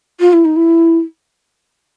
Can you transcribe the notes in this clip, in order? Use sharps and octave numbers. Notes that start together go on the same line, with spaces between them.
F4
E4
D#4
E4